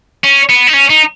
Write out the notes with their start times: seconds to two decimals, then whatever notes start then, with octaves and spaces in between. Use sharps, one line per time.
0.24 C#4
0.50 B3
0.68 D#4
0.74 C#4
0.90 D#4